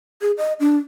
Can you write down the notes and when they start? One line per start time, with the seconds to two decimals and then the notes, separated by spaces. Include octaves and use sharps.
0.21 G#4
0.38 D#5
0.60 D4